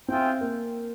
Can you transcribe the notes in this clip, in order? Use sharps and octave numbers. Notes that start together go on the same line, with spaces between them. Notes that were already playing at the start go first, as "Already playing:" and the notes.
C4 F4 G#4 E5 G5
A#3